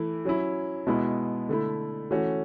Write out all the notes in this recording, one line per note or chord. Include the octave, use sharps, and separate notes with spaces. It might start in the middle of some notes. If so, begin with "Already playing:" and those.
Already playing: E3 A3 E4
F#3 C#4 E4
B2 G#3 B3 E4
D3 A3 E4
E3 A3 C#4 F#4